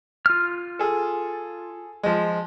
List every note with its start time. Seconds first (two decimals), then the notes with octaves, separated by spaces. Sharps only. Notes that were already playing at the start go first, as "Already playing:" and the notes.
0.26 F4 F6
0.79 G#4 A4
2.03 F3 G#3